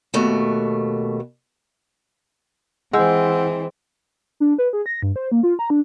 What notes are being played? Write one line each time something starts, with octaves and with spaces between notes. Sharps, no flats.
D#2 B2 A3
E3 G#3 C4 F#5 E6 G6
D4
B4
G#4
A#6
G2
C5
A#3
F4
A#5
D4